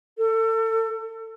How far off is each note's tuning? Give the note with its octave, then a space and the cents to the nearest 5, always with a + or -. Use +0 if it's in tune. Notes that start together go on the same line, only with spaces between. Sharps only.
A4 +30